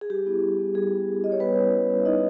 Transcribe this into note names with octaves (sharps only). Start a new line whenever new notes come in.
G#4
G3 G4
B3 E4
G3
B3 E4
G3 G#4
B3 E4
G3
B3 E4 C#5 D#5
G3 B3 B4
C#4 E4
G3
C#4 E4
E5
G3 D#4 D#5